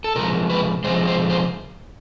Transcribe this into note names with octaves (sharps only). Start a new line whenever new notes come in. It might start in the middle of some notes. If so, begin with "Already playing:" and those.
A4
C3 F3 G#3 A#4
B4
C3 F3 G#3 C5
C5
C5